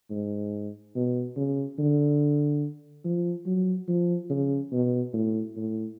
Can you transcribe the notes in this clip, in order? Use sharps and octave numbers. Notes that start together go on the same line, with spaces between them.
G#2
B2
C#3
D3
F3
F#3
F3
C#3
B2
A2
A2